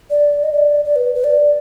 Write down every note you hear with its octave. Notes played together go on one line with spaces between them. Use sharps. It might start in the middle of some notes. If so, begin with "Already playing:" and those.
D5
D#5
D5
D5
B4
B4
D5